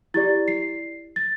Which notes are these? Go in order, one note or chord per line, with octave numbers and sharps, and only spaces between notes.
E4 G4 D5 A6
C7
A6